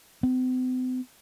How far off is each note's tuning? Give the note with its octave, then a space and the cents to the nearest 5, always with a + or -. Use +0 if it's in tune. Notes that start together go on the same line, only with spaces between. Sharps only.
C4 -45